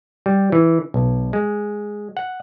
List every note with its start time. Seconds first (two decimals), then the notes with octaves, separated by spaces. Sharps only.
0.26 G3
0.52 E3
0.94 B1
1.33 G#3
2.17 F#5